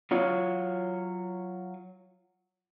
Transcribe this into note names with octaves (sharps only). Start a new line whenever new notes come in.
F#3 F4 C#5